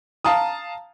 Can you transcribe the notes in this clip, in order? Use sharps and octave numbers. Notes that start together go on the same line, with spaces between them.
F5 A5 A#5 D#6